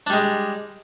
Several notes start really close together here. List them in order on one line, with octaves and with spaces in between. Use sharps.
D4 G3 G#3